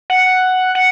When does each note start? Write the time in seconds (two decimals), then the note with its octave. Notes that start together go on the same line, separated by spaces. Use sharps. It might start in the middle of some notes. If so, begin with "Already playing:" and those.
0.10 F#5
0.75 F#5